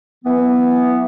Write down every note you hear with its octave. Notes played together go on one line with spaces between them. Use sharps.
E3 F#3 B3